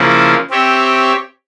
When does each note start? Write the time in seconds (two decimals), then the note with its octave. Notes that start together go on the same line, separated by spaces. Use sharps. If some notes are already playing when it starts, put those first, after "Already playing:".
Already playing: C#3 F3 A#3 E4
0.50 C4 G4 C#5 E5